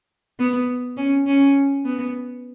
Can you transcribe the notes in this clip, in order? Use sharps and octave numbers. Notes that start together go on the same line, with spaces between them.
B3
C#4
C#4
B3